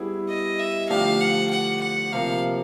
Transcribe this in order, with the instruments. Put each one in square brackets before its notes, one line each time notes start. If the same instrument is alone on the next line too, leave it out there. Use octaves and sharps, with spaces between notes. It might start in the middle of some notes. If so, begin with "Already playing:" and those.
Already playing: [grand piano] G3 B3 E4 G#4
[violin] D#5
E5
[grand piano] D3 F3 A3 D4 G4 [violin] F5
[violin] F#5
F#5
F#5
[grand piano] C3 F3 A#3 [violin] F5